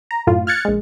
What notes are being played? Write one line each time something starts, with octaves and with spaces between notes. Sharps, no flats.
A#5
F#2 A2 F4
F6 F#6 G#6 A6 C#7
A#1 G#3